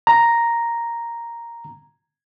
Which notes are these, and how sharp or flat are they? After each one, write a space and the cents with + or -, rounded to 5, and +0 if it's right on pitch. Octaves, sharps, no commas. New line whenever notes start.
A#5 +0